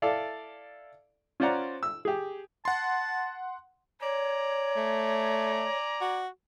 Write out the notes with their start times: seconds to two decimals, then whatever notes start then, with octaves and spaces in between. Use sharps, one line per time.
0.02 E4 A4 D5 F5
1.40 C#4 F4 C5 D5 F#5 A#5
1.83 E6
2.05 G4 G#4
2.65 F#5 A5 C6
4.02 C#5 D5 G#5 A#5
4.77 A3
6.01 F#4